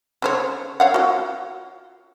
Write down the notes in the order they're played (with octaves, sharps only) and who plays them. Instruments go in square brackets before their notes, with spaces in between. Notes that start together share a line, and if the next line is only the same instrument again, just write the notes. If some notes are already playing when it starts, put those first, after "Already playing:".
[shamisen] C#3 C5 C#5
C#5 F5 F#5
F4 F#4